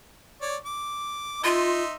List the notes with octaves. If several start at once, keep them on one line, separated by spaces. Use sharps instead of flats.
C#5 D5
D6
D#4 F4 E5 C6